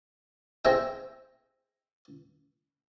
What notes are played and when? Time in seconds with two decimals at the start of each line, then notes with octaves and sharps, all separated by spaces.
0.65 C4 G#4 D#5 E5 G5